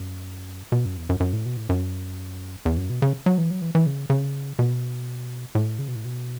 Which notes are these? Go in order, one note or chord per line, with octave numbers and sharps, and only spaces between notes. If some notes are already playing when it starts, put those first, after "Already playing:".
Already playing: F#2
B2
F#2
E2
F#2
F#2
A2
B2
A2
F#2
E2
F#2
B2
C#3
F#3
E3
F#3
E3
E3
C#3
C#3
B2
A2
C#3
B2
A2
B2